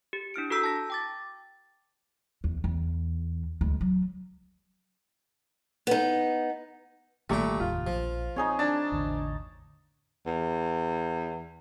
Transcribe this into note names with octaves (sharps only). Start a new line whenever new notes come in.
G4
D4 E4 F6 D7
F#4 A4 A#5 E6 G6 B6
A5 A#6
G5 D6 A6
E2
E2
D2 G#3
F#3
B3 D#4
G#1 A#2 D#3 G3 A3 G5
F1 D#2 A2 F4
A#1 F3
C4 D#4 G#4 C#5
D4 A5
A1 E2 D3
E2